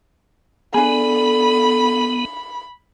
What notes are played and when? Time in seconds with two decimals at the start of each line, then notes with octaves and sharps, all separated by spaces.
0.74 B3 D4 G#4 A4 B5